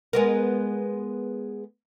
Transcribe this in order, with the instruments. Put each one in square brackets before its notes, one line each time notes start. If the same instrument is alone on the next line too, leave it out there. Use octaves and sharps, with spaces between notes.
[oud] G#3 B3 A#4